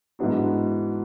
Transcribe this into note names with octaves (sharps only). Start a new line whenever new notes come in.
G#2 E3 B3 D4 F#4